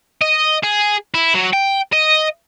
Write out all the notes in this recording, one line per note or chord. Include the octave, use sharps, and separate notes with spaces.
D#5
G#4
E4
F#3
G5
D#5